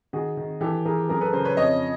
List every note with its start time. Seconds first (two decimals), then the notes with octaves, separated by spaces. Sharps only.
0.13 D#3 F#4 G#4
0.37 D#3
0.61 E3 G4 A4
0.85 E3 G#4 A#4
1.09 F#2 G#4 A#4
1.21 A4 B4
1.33 C#3 A#4 C5
1.45 B4 C#5
1.57 F2 C#5 D#5